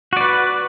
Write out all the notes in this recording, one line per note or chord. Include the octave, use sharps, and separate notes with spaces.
F#4 B4 D5